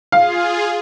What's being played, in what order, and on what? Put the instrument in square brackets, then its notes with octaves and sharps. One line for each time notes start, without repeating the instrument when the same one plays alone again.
[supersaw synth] F4 G#4 [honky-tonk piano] F5